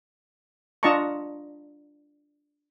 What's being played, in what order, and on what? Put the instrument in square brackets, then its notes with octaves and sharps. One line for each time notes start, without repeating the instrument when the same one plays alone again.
[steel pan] D4 F4 D#5 A5 A#5 C#6